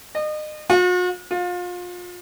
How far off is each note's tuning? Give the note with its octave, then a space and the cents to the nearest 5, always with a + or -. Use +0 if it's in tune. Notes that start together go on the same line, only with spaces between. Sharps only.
D#5 -35
F#4 -45
F4 +30